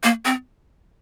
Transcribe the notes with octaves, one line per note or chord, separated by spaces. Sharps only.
A#3
C4